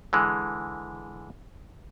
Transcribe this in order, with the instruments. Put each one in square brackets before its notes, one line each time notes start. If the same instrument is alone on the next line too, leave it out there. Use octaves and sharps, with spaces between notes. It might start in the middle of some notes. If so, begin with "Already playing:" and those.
[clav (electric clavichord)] D3 E3 G#3